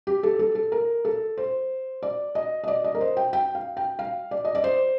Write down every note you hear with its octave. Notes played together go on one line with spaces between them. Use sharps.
G4
A4
A4
A4
A#4
A4
C5
D5
D#5
D#5
D5
D#5
A#4
C5
G5
G5
F5
G5
F5
D5
D#5
D5
C5